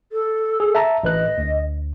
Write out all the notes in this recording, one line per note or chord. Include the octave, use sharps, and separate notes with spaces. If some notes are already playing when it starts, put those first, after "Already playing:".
A4
G#4
E5 A5 A#5
A1 B4 D#5 F#6
D2